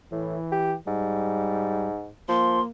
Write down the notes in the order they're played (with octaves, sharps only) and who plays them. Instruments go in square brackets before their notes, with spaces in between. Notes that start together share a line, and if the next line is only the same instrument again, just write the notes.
[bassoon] A2 [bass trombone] E3
[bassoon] G4
[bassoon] G#2 [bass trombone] G3
[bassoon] F3 [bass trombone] A#3 [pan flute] C6